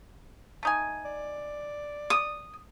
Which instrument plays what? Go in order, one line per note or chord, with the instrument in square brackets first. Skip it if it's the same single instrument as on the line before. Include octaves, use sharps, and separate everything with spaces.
[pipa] A3 D#4 G#5
[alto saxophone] D5
[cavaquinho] D#6